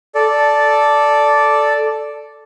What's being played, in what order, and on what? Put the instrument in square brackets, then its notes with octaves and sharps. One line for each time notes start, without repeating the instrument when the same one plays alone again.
[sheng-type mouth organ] A4 D5